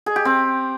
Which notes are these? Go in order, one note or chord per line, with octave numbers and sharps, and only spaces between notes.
G#4
G4
C4